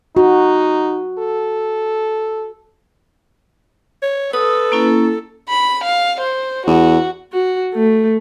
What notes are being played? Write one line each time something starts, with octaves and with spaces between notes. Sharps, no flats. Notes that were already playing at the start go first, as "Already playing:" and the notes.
D#4 F#4
A4
C#5
A4 B4 D#6
A#3 C#4 E4
B5
F5
C5
E2 F#4
F#4
A3